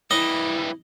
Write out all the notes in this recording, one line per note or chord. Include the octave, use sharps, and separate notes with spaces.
E3 G3 E4 D#5